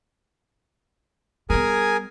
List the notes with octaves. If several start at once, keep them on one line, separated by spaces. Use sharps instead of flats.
G3 B3 G#4 A#4 G#5